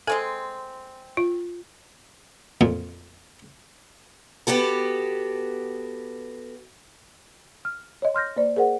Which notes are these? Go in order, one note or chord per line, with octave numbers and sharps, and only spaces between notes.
G#3 C4 A4 G#5
F4
F2 A#2
B3 F#4 G4 A4
F6
C#5 D#5
C6 F6 G6 A#6
A#3 C5 D5
G#4 A#4 C5 F#5